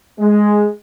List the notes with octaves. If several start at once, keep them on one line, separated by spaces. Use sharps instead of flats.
G#3